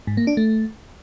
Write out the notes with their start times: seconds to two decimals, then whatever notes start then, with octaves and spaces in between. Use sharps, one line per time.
0.07 G#2
0.17 A#3
0.27 D4
0.37 A3